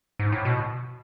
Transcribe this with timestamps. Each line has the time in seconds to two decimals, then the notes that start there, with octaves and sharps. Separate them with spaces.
0.19 G#2
0.32 A2
0.45 B2